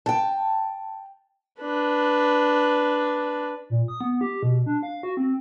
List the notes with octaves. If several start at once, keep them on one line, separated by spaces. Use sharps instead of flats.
G5 A5
D4 B4
A#2
D#6
B3
G4
B2
D4
F5
F#4
C4